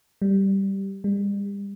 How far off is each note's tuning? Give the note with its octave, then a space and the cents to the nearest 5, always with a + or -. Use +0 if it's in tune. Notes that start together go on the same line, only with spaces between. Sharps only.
G3 -5
G3 +40